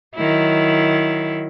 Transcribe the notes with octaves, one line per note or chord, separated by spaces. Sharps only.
D#3 F#3 E4